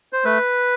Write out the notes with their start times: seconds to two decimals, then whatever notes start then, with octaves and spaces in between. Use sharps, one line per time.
0.13 C5
0.24 A3 B4